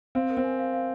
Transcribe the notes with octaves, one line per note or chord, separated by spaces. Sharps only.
C4 F5
A#4
C4
G#5
F5
F5